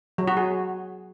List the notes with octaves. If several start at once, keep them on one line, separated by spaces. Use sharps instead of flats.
F#3
F#4
G#4